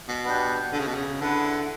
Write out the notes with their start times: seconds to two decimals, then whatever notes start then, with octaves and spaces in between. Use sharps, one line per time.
0.08 B2
0.24 B3 D4 G4
0.73 D3
0.80 C#3
0.87 B2
0.95 C#3
1.21 D3 E4 B4 F#5